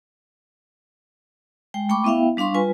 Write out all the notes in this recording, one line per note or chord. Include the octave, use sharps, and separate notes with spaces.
G#3 G5
A3 G5 B5 C#6 D6
B3 E4 E5 F5 G5
G3 D4 F5 C6 C#6
G3 F4 B4 G#5